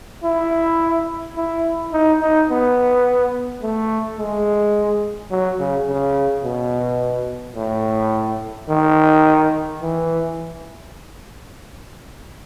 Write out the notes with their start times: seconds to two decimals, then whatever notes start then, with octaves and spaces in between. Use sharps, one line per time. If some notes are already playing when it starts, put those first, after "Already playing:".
0.24 E4
1.37 E4
1.93 D#4
2.21 D#4
2.49 B3
3.62 A3
4.19 G#3
5.31 F#3
5.59 C#3
5.87 C#3
6.44 B2
7.56 A2
8.69 D#3
9.82 E3